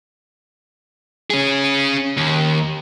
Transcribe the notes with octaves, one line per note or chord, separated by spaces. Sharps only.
C#4 G#4
D#2